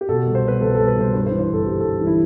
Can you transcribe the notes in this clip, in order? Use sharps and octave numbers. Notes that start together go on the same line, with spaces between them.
G4
B2 A4
A4
C2
C5
B2 B4
C2 A4
A4
B2
B4
C2 C5
G2 B4
C5
E3
C5
G1 A4
G1 G4
A4
G2
E3
E4